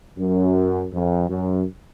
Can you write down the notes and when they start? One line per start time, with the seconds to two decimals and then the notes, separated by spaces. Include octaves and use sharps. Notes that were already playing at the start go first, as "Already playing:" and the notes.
0.18 F#2
0.93 F2
1.29 F#2